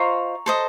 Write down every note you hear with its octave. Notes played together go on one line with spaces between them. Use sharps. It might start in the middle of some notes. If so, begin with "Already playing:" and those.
Already playing: F4 C5 D#5 A#5 C#6
A4 C5 D#5